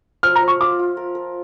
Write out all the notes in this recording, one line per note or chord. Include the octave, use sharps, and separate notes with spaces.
F3 F6
A#5
F3
C#6
F4 D6
F4
A#4
A#4